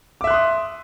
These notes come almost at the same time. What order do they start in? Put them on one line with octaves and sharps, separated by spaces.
D6 E5 F#6 C6 D#6